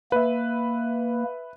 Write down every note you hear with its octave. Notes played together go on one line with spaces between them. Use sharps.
A#3 B4 E5